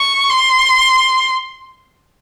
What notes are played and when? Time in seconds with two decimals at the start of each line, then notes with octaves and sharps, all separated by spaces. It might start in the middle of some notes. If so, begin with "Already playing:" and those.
Already playing: C#6
0.30 C6